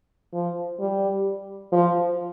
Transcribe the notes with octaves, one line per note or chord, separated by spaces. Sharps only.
F3
G3
F3